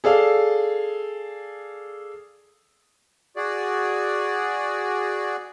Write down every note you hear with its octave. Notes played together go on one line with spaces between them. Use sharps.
G#4 A4 D5 F5
F#4 G#4 D5